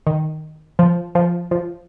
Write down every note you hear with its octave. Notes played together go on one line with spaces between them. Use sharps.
D#3
F3
F3
F3